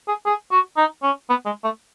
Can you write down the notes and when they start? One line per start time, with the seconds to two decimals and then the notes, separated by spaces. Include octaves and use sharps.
0.08 G#4
0.26 G#4
0.52 F#4
0.77 D#4
1.03 C#4
1.30 B3
1.46 G#3
1.64 A3